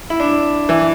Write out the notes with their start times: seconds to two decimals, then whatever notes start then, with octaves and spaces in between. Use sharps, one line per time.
0.10 E4
0.20 D4
0.69 E3